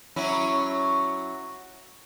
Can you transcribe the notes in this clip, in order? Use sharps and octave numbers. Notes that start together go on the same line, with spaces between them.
F#3 C#4 E4